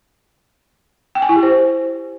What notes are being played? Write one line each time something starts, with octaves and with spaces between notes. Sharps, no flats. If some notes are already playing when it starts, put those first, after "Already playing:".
G5
G#5
E4
G4
C5